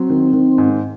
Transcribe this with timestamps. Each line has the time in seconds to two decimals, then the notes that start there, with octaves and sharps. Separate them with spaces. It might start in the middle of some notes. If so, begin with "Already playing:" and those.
Already playing: F#3 C4
0.10 D#3
0.33 D#3
0.58 G#2